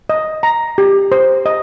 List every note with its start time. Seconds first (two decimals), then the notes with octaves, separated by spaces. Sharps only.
0.10 D#5
0.43 A#5
0.78 G4
1.12 C5
1.46 D#5